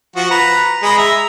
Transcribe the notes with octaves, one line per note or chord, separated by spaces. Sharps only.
F3 F#4
B4 A#5
G#3 D#5 B5
E5 A#5